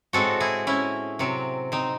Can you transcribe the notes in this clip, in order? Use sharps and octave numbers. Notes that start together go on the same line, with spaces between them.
A2 G#3 C4 F#4 A4
E4 G#4
C#4 E4
C3 F#3 C4
C4 D#4